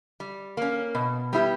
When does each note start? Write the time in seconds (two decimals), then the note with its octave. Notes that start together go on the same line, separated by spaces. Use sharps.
0.20 G3
0.57 A#3 C#4
0.95 B2
1.33 G3 B3 E4 G4